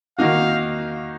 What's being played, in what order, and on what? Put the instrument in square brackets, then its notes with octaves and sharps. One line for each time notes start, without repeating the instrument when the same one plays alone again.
[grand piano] D#3 A#3 D#4 F#4 [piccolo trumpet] F5